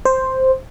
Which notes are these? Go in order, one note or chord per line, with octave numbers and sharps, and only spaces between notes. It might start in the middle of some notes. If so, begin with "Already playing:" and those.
C5